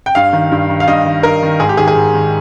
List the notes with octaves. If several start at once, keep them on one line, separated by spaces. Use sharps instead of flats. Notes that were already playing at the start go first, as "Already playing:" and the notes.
G5
G2 F5
D#3
G2
D#3
F5
G2 D#5
D#3
G2 A#4
D#3
G#2 G#4
G4
D#3 G#4
G#4
G#2
D#3